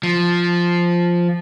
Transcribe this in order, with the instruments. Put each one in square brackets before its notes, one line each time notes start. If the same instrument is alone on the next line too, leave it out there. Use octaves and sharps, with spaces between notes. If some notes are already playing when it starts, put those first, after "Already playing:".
[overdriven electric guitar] F3